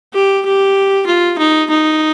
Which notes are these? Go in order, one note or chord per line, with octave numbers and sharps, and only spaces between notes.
G4
G4
F4
D#4
D#4